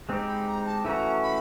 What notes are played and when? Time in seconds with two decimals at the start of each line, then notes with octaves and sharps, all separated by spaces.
0.09 G#3 C4 D#4 G4
0.27 B5
0.47 A#5
0.65 A5
0.85 E3 A3 C#4 F#4 A#5 B5
1.23 B5